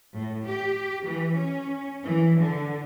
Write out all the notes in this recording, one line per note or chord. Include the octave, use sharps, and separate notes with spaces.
A2
G4
E3
C#4
E3
D3